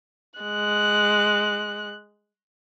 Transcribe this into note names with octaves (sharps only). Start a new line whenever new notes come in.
G#3 F#6